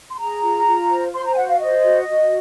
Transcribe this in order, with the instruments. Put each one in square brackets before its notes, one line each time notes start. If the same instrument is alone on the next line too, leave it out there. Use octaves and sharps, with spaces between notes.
[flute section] C6
G#4 A#5
F4
F4
C5
C5 C6
A#5
G#5
F#4 F#5
F5
C5 D#5
F#4
F#4